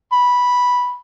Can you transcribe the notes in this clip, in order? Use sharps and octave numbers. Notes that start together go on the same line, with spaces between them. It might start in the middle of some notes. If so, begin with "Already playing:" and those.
B5